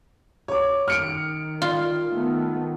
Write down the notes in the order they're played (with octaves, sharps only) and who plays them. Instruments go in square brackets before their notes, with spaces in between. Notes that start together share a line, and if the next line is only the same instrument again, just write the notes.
[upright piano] C#5 D6
[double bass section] D#3 [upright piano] F6 C#7 D7
[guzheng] F4
[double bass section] D#3 A3 B3